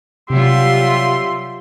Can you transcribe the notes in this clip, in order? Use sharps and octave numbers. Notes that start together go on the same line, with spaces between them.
C3 F#3 G3 F4 G4 E5 C6